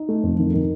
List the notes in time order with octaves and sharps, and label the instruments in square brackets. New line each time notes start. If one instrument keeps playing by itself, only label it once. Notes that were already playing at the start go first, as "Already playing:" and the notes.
Already playing: [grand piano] D#4
A3
F2
D#3
D#3